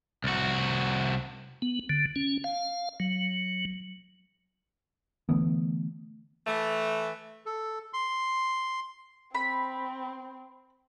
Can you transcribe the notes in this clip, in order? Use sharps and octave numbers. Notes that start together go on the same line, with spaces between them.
C2 F#4
B3
D3
C#4
F5
F#3
D3 E3 A3 B3
E3 A3
A4
C6
C4 B5